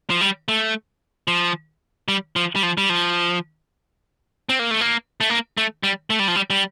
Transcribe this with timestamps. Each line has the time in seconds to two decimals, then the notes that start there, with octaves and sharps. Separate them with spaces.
0.10 F3
0.21 G3
0.48 A3
1.28 F3
2.08 G3
2.36 F3
2.55 G3
2.63 F3
2.78 G3
2.90 F3
4.49 C4
4.59 A#3
4.71 A3
4.81 A#3
5.21 A3
5.30 A#3
5.57 A3
5.83 G3
6.10 A3
6.19 G3
6.28 F3
6.36 G3
6.50 G3